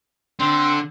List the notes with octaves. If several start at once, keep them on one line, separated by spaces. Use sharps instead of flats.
D3 C4